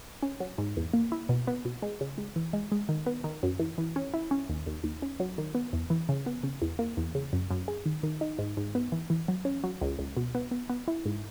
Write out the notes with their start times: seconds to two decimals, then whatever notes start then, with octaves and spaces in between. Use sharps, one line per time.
0.23 C#4
0.40 F#3
0.58 G#2
0.77 E2
0.93 A#3
1.12 E4
1.29 B2
1.47 B3
1.65 B2
1.82 G#3
2.01 C#3
2.18 G#3
2.36 E3
2.53 G#3
2.72 G#3
2.89 D#3
3.06 B3
3.24 D#3
3.43 F#2
3.60 E3
3.78 E3
3.96 C#4
4.14 E4
4.31 C#4
4.49 D#2
4.66 D#2
4.84 D#2
5.02 C#4
5.20 F#3
5.38 D#3
5.55 B3
5.73 E2
5.90 E3
6.09 C#3
6.26 B3
6.43 C#3
6.62 E2
6.79 A#3
6.97 E2
7.15 C#3
7.33 F#2
7.51 F#2
7.68 G#4
7.86 D#3
8.03 D#3
8.21 D#4
8.39 G#2
8.57 G#2
8.75 B3
8.92 E3
9.10 E3
9.28 F#3
9.45 C#4
9.64 F#3
9.81 C#2
9.99 C#2
10.17 B2
10.35 B3
10.51 B3
10.70 B3
10.88 E4
11.05 G#2